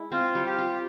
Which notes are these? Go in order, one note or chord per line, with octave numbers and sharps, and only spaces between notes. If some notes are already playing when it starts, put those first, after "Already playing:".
Already playing: G#3 E4
C4 F4
G3
G4
F4